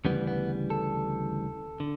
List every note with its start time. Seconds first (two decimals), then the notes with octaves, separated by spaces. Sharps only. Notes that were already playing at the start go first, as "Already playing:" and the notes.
0.05 D2 C#3 E3 G3 B3
0.27 B3
0.70 A4
1.80 D3